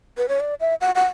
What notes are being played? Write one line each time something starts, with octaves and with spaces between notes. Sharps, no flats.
B4
C#5
D5
E5
F#5
F#5